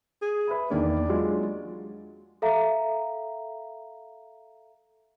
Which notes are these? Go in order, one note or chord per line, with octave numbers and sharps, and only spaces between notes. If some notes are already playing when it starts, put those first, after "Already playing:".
G#4
B4 E5 B5
E2 D#3 A#3 D4
F#3 G#3 F4
A4 E5 F5 A#5